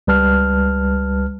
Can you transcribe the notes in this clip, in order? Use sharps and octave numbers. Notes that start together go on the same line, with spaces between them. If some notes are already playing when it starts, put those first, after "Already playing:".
C#2 G3 B4 A5 F6